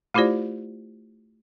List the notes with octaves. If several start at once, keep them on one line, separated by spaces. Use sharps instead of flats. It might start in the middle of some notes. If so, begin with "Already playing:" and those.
A3 E4 F4 G4 C5 D5